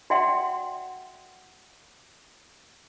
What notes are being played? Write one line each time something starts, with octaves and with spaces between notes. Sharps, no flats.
F#4 D5 E5 F#5 G5 C6